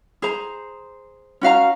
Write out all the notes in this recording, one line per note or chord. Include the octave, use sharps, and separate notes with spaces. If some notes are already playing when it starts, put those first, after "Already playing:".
G#4 C5 A#5
C#4 F#4 F5 A#5